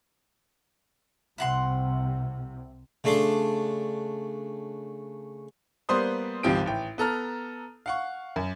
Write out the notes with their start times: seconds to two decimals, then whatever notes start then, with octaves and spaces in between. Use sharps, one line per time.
1.38 C2 C3 E4 F#5 C6
3.04 C#3 A3 D4 C6 D6
5.89 G3 A#3 B3 C5 C6 D#6
6.43 G#1 C#2 F3 C4 G4 D7
6.66 A1 G5
6.98 B3 A4 A#5 F6
7.86 F5 F#5 C#6
8.36 F#2